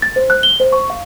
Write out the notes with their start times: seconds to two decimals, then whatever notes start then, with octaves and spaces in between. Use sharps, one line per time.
0.02 A6
0.16 C5
0.30 F#6
0.43 G7
0.60 C5
0.72 C#6
0.90 F5